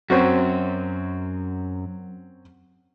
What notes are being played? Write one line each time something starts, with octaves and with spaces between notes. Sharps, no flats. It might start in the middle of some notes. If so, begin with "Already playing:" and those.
F#2 C4 C#4 F#4